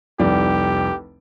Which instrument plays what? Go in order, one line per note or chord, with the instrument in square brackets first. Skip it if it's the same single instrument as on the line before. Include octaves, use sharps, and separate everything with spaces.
[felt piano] F1 C2 D5 [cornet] G4